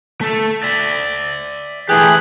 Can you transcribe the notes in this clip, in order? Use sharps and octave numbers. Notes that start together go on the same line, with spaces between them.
A3 A4
D5 E5
E3 A3 G4 G#4 F#6